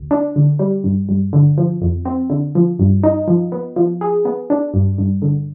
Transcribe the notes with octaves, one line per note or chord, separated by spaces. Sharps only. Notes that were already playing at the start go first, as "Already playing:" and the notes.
Already playing: D2
D4
D3
G3
G2
G2
D3
F3
F2
C4
D3
F3
G2
D#4
F3
B3
F3
G#4
B3
D4
G2
G2
D3